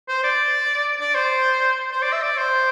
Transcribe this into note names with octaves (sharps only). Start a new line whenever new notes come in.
C5
D5
D5
C5
C5
D5
E5
D5
C5